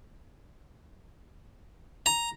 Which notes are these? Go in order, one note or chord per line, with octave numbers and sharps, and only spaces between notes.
A#5